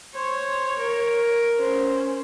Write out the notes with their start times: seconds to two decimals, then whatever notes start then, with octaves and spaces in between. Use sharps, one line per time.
0.15 C5 C#5
0.78 A#4
1.56 C#4 C5